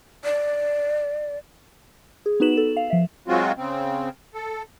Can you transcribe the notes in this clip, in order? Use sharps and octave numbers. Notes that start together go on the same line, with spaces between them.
D5
G#4
B3 D#4 F#4 B4 E7 F#7
A4
F5
F3 E5
F#3 G#3 C4 F4 F#4
C#3 C4
A4